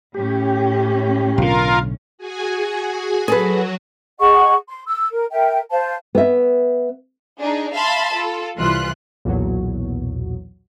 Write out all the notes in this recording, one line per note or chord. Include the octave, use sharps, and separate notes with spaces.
A2 C#4 G4
B1 D3 F4 A#4 F5
F#4 G#4 G#5
F#3 F#4 G#4 A4 B4
G#4 D#5 F#5 C#6
C6
E6
A#4
A#4 E5 G5
C5 F5 A5
B3 E5
D4 D#4 G#4
E5 F5 A5 B5 C6
F4 A4
C2 E3 F4 C6 F#6
B1 E2 A#2 F#3